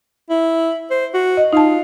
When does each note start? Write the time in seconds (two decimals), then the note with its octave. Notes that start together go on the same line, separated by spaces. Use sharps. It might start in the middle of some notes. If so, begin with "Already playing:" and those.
0.30 E4
0.90 C5
1.14 F#4
1.37 D#5
1.53 D#4 F4 A5